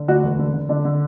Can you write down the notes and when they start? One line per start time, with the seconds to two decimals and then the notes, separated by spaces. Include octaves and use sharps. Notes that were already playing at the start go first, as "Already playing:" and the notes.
Already playing: D3
0.08 D2 D4 F#4
0.23 E1
0.39 D3
0.54 D3
0.69 D3 D4
0.85 D3